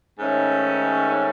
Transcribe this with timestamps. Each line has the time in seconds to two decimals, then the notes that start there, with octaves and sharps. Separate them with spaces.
0.17 G#2 D#3 A3 C#4